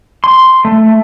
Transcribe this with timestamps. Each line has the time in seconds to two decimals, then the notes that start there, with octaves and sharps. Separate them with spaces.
0.24 C6
0.65 A3